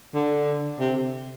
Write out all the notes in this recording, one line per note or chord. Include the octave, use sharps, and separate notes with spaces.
D3
C3